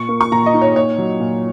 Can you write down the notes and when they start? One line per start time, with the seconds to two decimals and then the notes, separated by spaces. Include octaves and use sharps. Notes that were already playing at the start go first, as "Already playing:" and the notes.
Already playing: A#2 C#6
0.09 A#3
0.21 C#6
0.32 A#2 A#5
0.46 D#5
0.53 D#4
0.61 C#5
0.76 A#2 C#5
0.98 F#3
1.20 A#2